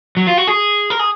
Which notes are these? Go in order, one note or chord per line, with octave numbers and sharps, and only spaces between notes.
F#3
F4
F#4
G#4
A#4
G#4